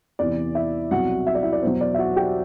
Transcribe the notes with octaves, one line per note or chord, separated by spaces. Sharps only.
E2 C3 E3 D5
E4 E5
C2 B2 F#3 F#4 F#5
E5
D5
E4 E5
D5
E2 B2 F#3 C5
D5
E5
F#4 F#5
G4 G5